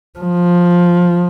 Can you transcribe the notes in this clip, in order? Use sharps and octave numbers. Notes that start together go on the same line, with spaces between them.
F3